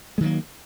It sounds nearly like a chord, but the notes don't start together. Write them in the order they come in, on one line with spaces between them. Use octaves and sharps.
G#3 D#3 F#3 A#3